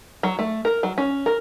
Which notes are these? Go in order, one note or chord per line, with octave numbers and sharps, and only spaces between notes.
F#3
A3
A#4
F#3
C#4
A#4